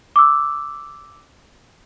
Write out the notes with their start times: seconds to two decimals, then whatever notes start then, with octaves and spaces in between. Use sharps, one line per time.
0.16 D6 E6